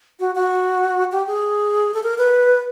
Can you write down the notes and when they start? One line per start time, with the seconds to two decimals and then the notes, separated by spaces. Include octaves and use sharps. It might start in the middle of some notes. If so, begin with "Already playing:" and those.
0.20 F#4
0.35 F#4
1.12 G4
1.27 G#4
1.94 A4
2.03 A#4
2.18 B4